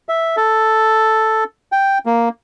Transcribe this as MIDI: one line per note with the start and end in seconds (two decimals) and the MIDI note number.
0.09 0.36 76
0.37 1.44 69
1.72 1.98 79
2.06 2.29 58